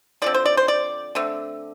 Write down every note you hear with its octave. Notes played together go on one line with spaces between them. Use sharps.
D3 F3 C4 D5
C5
D5
C5
D5
D3 A3 C4